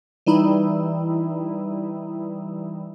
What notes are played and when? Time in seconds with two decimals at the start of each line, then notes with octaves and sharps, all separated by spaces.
0.26 E3 G3 D#4 E4